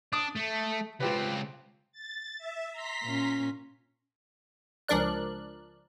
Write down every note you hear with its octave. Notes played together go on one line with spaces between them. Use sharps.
D4 D#6
A3
C#2 C4 F4 G4 B4
A6
E5
A#5 C6 B6
A#2 C#4
C#2 F3 D4 A#4 D5 F#6